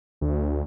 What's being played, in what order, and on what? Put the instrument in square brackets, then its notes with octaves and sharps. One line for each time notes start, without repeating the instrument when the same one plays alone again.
[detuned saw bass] D2